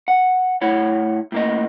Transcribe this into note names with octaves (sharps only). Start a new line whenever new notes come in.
F#5
A2 E4 C#5 F#5
A2 A#3 D#5